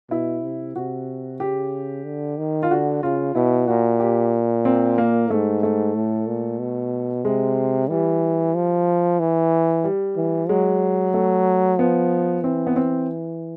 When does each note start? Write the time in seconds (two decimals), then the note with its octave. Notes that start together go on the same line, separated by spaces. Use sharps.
0.10 B2 E4
0.43 C3
0.76 C3 F#4
1.40 C#3 G4
2.05 D3
2.38 D#3
2.63 F4
2.70 D3 F#4
3.03 C#3 F4
3.35 B2 E4
3.67 A#2 F#4
4.00 G4
4.65 C4
4.98 A#3
5.30 G#2 A3
5.63 A3
5.95 A2
6.27 A#2
6.59 B2
7.25 C3 G#3
7.90 E3 G3
8.55 F3
9.20 E3
9.84 G3
10.17 E3
10.49 F#3 G#3
11.14 A3
11.79 F3 B3
12.44 E3 C4
12.67 B3
12.76 C4